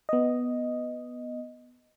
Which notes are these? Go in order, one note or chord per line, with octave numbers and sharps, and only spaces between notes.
B3 D#5